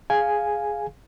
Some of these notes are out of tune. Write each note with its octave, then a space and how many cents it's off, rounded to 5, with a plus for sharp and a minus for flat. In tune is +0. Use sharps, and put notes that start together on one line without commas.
G#4 +0 F5 +0 G#5 +0